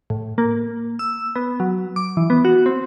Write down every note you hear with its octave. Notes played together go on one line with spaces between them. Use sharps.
A2
A#3
E6
B3
F#3
D6
E3
B3
F#4
C4